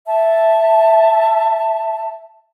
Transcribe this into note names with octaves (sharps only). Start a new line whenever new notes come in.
E5 A5